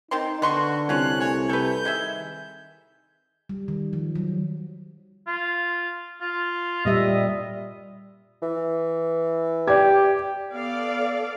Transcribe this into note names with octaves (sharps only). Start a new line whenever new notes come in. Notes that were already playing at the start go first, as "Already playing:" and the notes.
D#3 C4 D#4 C6
D3 B3 F#4 C6 C#6
C2 C#4 F4 C#5 F#6
A3 C#5 G#5
C3 A4 B4 G6
D#3 G#3 G#4 E5
G3
D#3
F3
F#3
F4
F4
A#2 G3 D#5 E5
E3
G4 D5 G#6
B3 A4 D5 F5